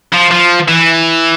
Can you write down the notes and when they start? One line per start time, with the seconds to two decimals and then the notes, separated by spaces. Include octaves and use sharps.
0.13 F3
0.31 F3
0.68 E3